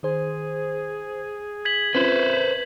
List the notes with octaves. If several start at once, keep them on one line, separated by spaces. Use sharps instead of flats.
D#3 G#4 C5
G#6 B6 F#7
C4 C#4 F4 B4 C5 E5